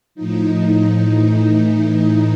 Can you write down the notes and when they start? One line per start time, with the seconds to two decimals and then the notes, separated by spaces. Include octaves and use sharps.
0.15 A2 F3 D#4
1.01 A2 E3 D#4